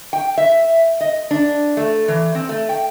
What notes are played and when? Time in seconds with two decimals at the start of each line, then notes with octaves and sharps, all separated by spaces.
0.13 G5
0.38 E5
1.01 D#5
1.31 D4
1.77 A3
2.08 E3
2.35 C4
2.49 A3
2.69 G5